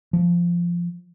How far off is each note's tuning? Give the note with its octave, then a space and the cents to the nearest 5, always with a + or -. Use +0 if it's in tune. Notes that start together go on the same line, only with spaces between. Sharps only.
F3 -10